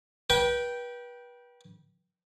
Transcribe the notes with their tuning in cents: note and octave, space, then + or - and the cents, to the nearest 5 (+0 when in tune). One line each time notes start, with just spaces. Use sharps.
B4 -35 G5 -5